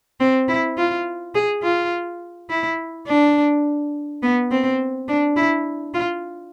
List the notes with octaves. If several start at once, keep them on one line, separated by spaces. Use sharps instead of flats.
C4
E4
F4
G#4
F4
E4
D4
B3
C4
D4
E4
F4